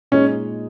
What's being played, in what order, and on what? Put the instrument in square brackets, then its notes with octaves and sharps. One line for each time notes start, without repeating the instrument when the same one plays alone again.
[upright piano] A#2 G#3 D#4 G#4 [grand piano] C#4